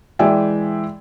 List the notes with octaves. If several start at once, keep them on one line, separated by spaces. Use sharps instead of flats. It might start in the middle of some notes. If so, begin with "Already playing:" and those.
E3 G#3 D5 E5 G5 G#5